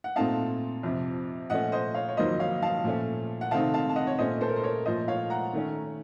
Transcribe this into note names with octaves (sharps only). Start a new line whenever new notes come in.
F#5
A#2 A3 C4 D#4 F5 A5
F2 C3 F3
A#2 F3 A3 C#4 D#5 F#5
C5 D#5
C#5 F5
C#5
F2 D#3 F#3 A#3 D#4 C5 D#5
C#5 F5
F5 A5
A#2 F3 A3 C#4
F#5
C3 D#3 A3 C4 D#4 F5 A5
F5 A5
A5
D#5 F#5
C#5
A#2 A3 C#4 C5 D#5
A4 C5
A#4
C5
A#4 C#5
A#2 F3 A3 C5 D#5
C#5 F5
F#5 A#5
D#3 A3 C#4